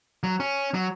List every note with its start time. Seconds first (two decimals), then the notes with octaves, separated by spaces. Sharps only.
0.23 F#3
0.40 C#4
0.74 F#3